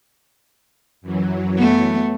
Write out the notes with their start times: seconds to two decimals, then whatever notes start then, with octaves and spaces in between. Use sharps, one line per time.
1.02 F#2 E3 F#3
1.57 A3 B3